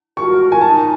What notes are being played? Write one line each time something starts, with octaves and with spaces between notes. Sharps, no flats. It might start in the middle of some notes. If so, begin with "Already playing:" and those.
F#4 A#4 C#6
G#5
D#4 A5